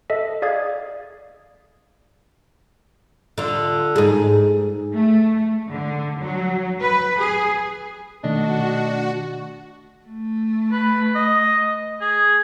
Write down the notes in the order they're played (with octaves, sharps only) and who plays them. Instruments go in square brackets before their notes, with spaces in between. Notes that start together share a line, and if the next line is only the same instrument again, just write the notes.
[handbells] A4 D#5 E5
G#4 D5 F5 D#6 G#6
[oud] D3 F4
G#2 G#4
[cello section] A3
D3
F#3
B4
G#4
[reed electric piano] B2 D#3 A3 [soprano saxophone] D4 [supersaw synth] F#4 [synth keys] D#5
[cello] A3
[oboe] B4
D#5
G#4